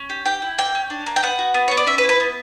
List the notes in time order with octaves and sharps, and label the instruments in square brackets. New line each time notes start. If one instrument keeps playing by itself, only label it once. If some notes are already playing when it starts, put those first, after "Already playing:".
Already playing: [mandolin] C#4
G4
G4 G5
E4
A#3 G5
C#4
D4
A#3
G5
B3 F#5
F#4
B3
B3 C#5
D5
C#4 E5
B4
E4
B4
B3